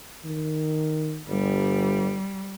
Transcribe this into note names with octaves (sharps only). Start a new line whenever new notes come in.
D#3
G1 G3